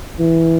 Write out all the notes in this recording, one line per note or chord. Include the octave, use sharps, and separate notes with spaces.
E3